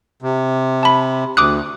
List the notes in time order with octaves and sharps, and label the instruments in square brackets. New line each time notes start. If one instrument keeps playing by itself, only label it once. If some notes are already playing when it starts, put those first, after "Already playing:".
[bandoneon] C3
[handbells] A5 B5
[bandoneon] D2 [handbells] D6 D#6 F#6